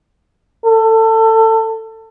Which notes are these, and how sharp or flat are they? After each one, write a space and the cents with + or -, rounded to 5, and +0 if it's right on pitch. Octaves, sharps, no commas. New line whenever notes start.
A4 +25